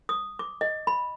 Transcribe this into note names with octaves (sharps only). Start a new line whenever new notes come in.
D#6
D6
D#5
B5